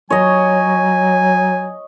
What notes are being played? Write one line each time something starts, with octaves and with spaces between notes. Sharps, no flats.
F#3 C#5 D#5 G#5